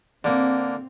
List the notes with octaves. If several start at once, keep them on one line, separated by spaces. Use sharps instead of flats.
D3 A#3 C4